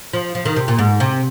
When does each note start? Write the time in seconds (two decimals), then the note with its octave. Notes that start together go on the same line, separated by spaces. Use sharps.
0.13 F3
0.35 F3
0.45 D#3
0.56 C3
0.68 A#2
0.79 G#2
1.00 C3